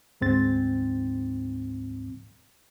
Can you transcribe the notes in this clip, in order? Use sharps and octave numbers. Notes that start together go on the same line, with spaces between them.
D2 G#2 C4 A6